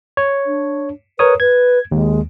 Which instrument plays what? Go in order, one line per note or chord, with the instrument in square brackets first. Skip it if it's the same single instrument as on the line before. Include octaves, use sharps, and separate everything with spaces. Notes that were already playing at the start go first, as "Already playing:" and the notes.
[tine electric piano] C#5
[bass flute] D4
[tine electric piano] A#4 C#5 D#6 [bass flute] B4
[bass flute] B4 [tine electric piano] G#6
[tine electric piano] D#2 [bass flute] G#3